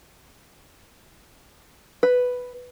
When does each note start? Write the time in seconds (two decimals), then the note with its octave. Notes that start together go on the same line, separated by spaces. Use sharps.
2.03 B4